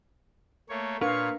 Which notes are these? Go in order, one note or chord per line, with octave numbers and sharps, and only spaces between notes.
A3 A#3 C#5
A#2 D4 A#4 B4 C#5 F5 C#6